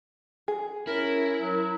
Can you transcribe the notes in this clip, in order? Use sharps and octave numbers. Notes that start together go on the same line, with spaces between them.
G#4
C#4 E4 A#4
F#3 A#4